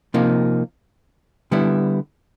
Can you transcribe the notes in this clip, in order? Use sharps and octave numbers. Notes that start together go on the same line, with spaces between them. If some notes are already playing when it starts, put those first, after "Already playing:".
C3 F3 A#3 D#4
D3 G3 B3 E4